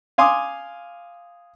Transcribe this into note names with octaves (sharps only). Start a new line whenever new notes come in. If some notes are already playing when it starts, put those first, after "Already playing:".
F5 G#5 C6 D6 D#6